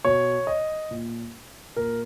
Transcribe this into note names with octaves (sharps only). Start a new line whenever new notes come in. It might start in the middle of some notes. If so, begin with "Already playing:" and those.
B2 C#5
D#5
A#2
A#2 A#4